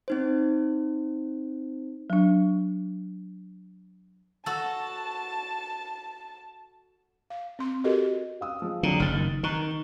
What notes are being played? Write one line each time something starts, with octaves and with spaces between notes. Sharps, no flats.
C4 D#4 C5
F#3 D4
F#4 A4 A5
F5
C4 C6
F#4 G4 A4 A#4 D#5
F5 D#6 E6
F3 G#3
F2 D3 F#3 A#5
F#1 D#3 F6 A6
D#3 A#5 C#6 F#6